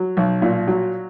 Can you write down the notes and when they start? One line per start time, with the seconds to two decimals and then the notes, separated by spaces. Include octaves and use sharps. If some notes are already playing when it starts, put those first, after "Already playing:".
Already playing: F#3
0.17 B1
0.42 A#2
0.68 F#3